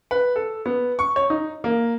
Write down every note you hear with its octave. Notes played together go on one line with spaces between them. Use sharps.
B4
A4
B3
C#6
C#5
D#4
A#3